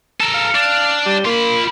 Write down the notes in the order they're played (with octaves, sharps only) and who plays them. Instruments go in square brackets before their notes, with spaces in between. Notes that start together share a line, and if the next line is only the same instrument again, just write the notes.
[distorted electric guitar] A4 A#4
[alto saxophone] F5
[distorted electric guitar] D4
[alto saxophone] G3
[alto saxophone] A#3 [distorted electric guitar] F4 B5